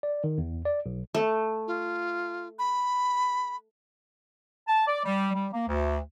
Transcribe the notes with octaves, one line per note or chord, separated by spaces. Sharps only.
D5
D#3
E2
D5
B1
A3
F4
B5
A5
D5
G3
G3
A#3
D2